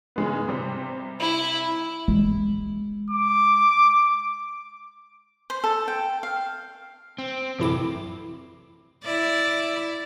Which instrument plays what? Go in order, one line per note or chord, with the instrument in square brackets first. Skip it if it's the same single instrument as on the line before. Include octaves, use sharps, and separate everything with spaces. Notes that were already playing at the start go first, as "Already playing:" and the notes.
[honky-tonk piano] C#3 G#3 B3
C3 G3 C4
[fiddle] E4
[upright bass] G#3
[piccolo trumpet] D6
[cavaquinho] C5
A4
G5
F5
[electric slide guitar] C4
[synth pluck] A1 E4 D6 [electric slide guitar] F#2 C3
[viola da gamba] E4 D5